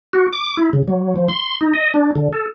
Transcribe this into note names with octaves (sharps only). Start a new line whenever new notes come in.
F#4
D6
E4
C#3
F#3
F3
C6
D#4
D#5
D4
D3
A4